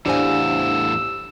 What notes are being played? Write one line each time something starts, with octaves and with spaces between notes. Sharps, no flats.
E2 A2 D4 G4 C5 F5 G#5 E6